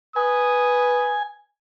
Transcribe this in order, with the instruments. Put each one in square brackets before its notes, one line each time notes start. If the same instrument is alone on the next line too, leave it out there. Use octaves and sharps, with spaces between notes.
[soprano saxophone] B4 [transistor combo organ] G#5 [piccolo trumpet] D#6